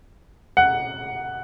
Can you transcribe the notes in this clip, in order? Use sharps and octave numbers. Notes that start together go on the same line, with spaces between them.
F#5